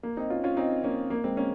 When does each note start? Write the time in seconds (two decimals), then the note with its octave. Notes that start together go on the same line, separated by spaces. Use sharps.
0.03 A#3
0.17 C4 D#4
0.30 C#4 F4
0.44 C#4 F4
0.57 C4 D#4
0.84 A#3 C#4
1.10 A#3
1.24 G#3 C4
1.37 A#3 C#4